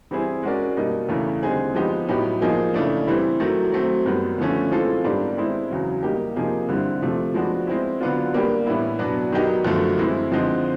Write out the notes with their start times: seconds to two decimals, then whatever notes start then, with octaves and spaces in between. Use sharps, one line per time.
0.11 E3 G3 C4 E4 G#4
0.43 G#3 C#4 F#4 A#4 D5
0.77 B2 G3 A#3 D#4
1.09 E2 C#3 E3 A3
1.43 D3 G3 C4 D#4 G#4
1.75 F3 G#3 B3 D#4 G4
2.09 A2 F#3 B3 D#4 G4
2.41 F3 A#3 D#4 G#4
2.74 C#3 E3 A3 D4
3.07 E3 G3 C4 E4
3.40 D#3 F#3 A3
3.72 F#3 A3 C4
4.05 F#2 D#3 G3 B3
4.38 D3 F3 A3 C#4
4.71 E3 G#3 C4 F4 A4
5.04 G#2 D#3 G3 B3 D4
5.38 G#3 C4 E4
5.70 E2 C#3 F#3
6.03 G3 A#3 D#4 G4
6.36 C3 F3 A#3 D#4 G#4
6.68 G2 D3 G3 C4 E4
7.02 C3 F3 A3
7.34 F3 G#3 B3 D4 F#4
7.67 G#3 C4 E4
8.01 D3 F#3 B3 D4 F4
8.33 G3 A#3 D4 G4 B4
8.66 A2 E3 G3 B3 E4
8.99 B2 F#3 B3 D4 F#4
9.32 D#3 F#3 B3 D#4 G4
9.65 F#2 D3 F3 A3
9.97 E3 G#3 C4 E4
10.32 D3 F3 G#3 C4 D#4